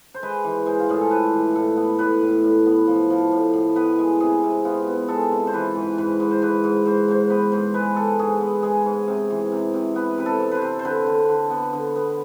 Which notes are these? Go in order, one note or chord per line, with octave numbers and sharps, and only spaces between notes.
C5
G#3 B4
E3
G#3 C5
F4
A2 G#4
A4
A2 B4
E3
A2 A4
B3
A2 B4
A2
A2
B3
F3
F3
A2
A2
B3 B4
G#3
C3 G#4
C3
B3 F4
B3
G#3 A4
C3
C5
E3 B4
G#2
G#2 B4
G#2
C5
G#2 B4
G#2
G#2 C5
G#2 C5
B3 B4
G#2 C5
G#3 B4
G#3 A4
G#2 G#4
B3
G#3 G#4
G#2
C3
E3
C3
C3
B3 B4
C3 B4
A4
C3
B4 C5
C3
C5
D3 B4
D3
D3
B3
D3
B3